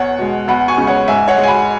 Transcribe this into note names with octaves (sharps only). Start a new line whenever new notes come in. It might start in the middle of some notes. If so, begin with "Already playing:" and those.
Already playing: E2 C#5 F#5
B2 G#3
E2 F#5 B5
G#5 C#6
C#3 G#3
C#5 F#5
G#2 E5 G#5
C#5 F#5
G#3
G#5
F#5 B5